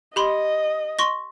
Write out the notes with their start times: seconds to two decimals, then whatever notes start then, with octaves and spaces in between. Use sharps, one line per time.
0.16 G4 D#5 B5 C6
0.99 C6 C#6 A#6